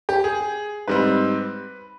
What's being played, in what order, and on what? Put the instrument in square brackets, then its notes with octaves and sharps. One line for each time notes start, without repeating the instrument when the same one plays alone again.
[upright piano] G4
G#4
G#2 G3 C4 B4